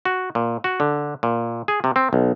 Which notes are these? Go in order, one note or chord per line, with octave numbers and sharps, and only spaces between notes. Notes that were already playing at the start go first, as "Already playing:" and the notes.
F#4
A#2
F#4
D3
A#2
G#4
C3
C4
B1